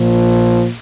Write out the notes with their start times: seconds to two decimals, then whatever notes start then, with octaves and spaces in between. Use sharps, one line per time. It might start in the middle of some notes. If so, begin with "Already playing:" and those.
Already playing: A#2 F3